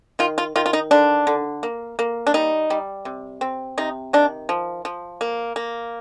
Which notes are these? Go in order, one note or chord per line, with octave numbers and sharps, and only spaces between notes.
D#3 F4
F4
D#3 F4
F4
D#4
D3 D4
D3
A#3
A#3
D4
G3 D#4
G3
C3
C4
C3 D#4
D#3 D4
F3
F3
A#3
A#3